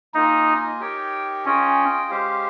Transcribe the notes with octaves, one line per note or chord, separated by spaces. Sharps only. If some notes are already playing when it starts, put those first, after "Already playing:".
A#3 D#4 F4 A#4 D#5 G#5
D#4 G4 A#4 C#5 G5
C#4 F4 G#4 D#5 G5
G#3 C#4 G4 C5 F5